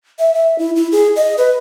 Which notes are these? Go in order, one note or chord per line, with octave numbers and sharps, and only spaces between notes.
E5
E5
E4
E4
G#4
D#5
B4